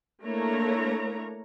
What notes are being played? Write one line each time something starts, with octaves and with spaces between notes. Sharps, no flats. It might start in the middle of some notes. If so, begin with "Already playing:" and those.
A3 A#3 D4 E4 C#5 A#5